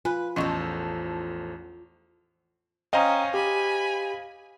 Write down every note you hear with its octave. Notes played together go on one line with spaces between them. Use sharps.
F4 B4 G#5 B5
A1 E2 F3 C#4 A4 D#5 C#6
C#4 C5 D#5 F5 G5 A#5 D#6
G4 G#5 B5